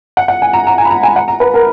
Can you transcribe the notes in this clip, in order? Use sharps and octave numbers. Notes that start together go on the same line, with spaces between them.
F#5
F#5
G#5
A#5
A#5
G#5
B5
A#5
G#5
F#5
A#5
B4
A#4